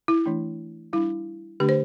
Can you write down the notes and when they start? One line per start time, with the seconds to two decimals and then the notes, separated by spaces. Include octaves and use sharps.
0.08 E4
0.26 E3 A3 D4
0.93 G3 D4 E4
1.60 D3 A3 D4 G4
1.69 C5